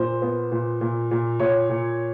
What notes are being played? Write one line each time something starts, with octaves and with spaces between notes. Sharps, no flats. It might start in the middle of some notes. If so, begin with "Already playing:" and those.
Already playing: A#2 C5
B3
A#2
A#2
A#2
A#2 C#5
A#2